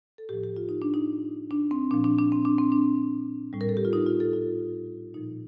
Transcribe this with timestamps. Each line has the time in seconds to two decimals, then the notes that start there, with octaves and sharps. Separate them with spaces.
0.18 A4
0.29 A2 F3 G4
0.43 G4
0.56 F4
0.69 D#4
0.82 D4
0.94 D#4
1.51 D4
1.71 C4
1.91 A#2 F3 D4
2.04 D4
2.19 D4
2.32 C4
2.45 D4
2.58 C4
2.72 D4
3.53 A2 G3
3.61 A#4
3.69 A4
3.77 G4
3.85 F4
3.93 D#4
4.06 F4
4.20 A4
4.33 F4
5.14 A#2 F3 D#4